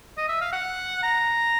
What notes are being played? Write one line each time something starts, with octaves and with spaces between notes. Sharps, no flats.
D#5
E5
F5
F#5
A#5